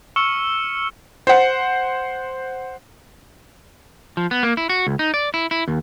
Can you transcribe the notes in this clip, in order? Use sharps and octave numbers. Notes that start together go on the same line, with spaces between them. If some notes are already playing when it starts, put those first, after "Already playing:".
C#6 E6 F6 C#7 E7 G7
C5 F#5
F3
B3
A#3
E4
F#4
C#2
D#4
D5
E4
E4
D#2